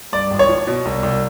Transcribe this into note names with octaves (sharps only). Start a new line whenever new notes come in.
G2 D5
G#1
C#5
F3
B2
C2
C2